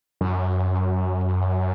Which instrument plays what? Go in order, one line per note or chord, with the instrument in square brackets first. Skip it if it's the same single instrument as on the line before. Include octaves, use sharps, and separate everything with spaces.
[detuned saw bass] F#2